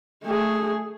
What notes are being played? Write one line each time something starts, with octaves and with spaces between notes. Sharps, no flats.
A3 G#4